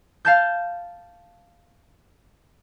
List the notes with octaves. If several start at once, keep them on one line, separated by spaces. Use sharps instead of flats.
F5 A5 G6